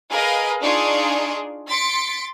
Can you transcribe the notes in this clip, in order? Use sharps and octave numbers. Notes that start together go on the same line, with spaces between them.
G#4 A#4 B4 D#5 F5
D4 D#4 F4 G#4 D5 C#6
C6 A6 B6 C#7 D7